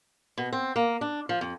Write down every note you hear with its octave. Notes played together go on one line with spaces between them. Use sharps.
B2
C4
A#3
D4
F3
F2